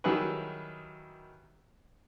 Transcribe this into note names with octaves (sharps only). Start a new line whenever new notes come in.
D#3 F#3 G3 E4 G#4 B4